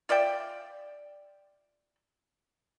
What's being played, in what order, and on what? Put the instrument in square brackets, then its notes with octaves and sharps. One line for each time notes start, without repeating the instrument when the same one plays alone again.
[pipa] F4 D5 E5 G5